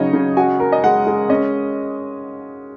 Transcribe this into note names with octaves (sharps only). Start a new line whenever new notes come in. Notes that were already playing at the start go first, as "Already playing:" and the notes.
Already playing: C#3 F#3 D#4 C#5 D#5
C#3
F#4 G#5
A#4
D#5
G#3 F#5
G#3
C#4 D#5